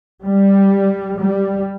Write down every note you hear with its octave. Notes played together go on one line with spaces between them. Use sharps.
G3
G3